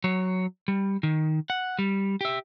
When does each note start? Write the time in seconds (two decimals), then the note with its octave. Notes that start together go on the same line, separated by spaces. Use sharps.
0.04 F#3 C#5
0.68 G3
1.03 D#3
1.50 F#5
1.79 G3
2.21 G4 E5